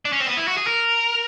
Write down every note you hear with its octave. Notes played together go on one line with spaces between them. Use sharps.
D4
C#4
C4
B3
E4
F#4
G#4
A#4